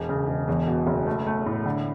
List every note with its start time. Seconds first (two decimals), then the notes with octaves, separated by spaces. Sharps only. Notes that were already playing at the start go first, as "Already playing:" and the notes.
Already playing: E1
0.09 C#3
0.28 E1
0.48 E2
0.67 B2
0.87 F#1
1.06 A3
1.27 A3
1.46 A2
1.66 D3